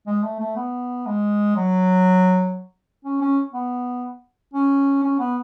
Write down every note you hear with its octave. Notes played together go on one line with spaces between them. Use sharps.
G#3
A3
A3
B3
G#3
F#3
C#4
C#4
B3
C#4
C#4
B3